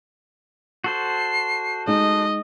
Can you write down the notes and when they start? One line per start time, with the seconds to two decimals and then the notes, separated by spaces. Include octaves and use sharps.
0.84 F#4 A4 C5 C7
1.88 G#3 D#4 D#5